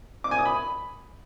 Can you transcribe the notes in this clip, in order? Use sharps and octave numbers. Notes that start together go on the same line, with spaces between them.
D6
G#5
D#6
B5